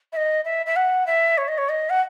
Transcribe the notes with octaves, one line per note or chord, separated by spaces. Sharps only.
E5
D#5
E5
E5
F#5
E5
C#5
D#5
C#5
D#5
F#5